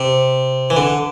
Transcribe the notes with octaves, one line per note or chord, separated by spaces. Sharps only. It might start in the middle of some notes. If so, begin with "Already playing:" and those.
Already playing: C3
E3
D3